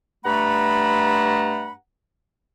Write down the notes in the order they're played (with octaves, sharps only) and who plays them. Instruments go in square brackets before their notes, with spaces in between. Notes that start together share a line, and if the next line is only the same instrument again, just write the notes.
[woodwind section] G2 A3 F#5 A#5 B5